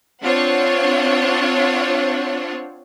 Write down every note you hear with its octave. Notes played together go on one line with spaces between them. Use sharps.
C4 D4 F4 C5 C#5 F#5